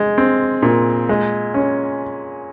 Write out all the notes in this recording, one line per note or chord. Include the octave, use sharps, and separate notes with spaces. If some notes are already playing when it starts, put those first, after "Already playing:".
Already playing: G#3
C4
A#2
G#3
C#4